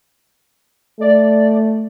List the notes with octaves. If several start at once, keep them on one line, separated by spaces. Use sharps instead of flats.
A3 D5